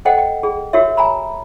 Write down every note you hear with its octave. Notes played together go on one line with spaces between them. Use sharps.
A4 C5 D#5 F#5 G5
G5
G#4
F#4 G4 A#4 C#5 E5
G#5 A#5 B5